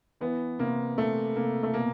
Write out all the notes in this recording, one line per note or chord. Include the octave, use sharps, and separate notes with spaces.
E3 B3
C3 A#3
C3 A3
C3 A#3
A3
B2 A#3